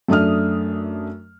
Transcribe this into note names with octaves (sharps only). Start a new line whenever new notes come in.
F#2 A3 D4 D#6 F6